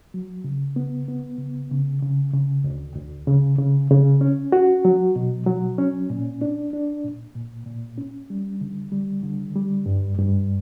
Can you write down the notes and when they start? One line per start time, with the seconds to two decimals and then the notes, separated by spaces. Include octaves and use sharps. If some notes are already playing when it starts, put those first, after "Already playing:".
0.14 F#3
0.44 C#3
0.76 B3
1.08 B3
1.38 C#3
1.71 C#3
2.02 C#3
2.33 C#3
2.64 D2
2.96 D2
3.28 C#3
3.59 C#3
3.90 C#3
4.21 C#4
4.52 F#4
4.85 F#3
5.16 B2
5.47 F#3
5.78 C#4
6.10 A#2
6.42 D4
6.73 D4
7.05 A#2
7.35 A#2
7.66 A#2
7.98 C#4
8.30 G3
8.61 D3
8.92 G3
9.23 D3
9.56 G3
9.86 G2
10.18 G2